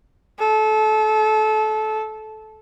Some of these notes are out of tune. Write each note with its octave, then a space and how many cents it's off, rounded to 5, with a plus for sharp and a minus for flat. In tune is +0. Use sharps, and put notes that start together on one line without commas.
A4 -25